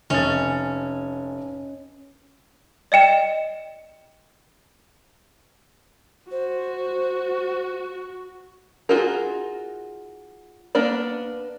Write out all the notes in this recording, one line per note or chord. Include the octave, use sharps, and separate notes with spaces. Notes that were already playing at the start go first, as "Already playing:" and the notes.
F1 C#4 A6
D5 D#5 G5 E7
F#4 C5
D#4 F4 F#4 G#4 A#4
A#3 B3 D4 A#4 D5